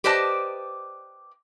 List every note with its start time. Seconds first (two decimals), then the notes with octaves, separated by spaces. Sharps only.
0.04 G4 B4 C5 D5 D#5 A5